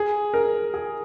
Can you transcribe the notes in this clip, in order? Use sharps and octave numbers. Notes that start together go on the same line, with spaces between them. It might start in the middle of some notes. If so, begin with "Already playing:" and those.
Already playing: G#4
A#4
G#4